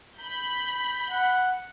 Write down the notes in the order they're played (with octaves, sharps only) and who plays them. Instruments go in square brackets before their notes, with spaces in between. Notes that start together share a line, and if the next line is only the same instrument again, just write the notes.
[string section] B5 G6
[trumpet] F#5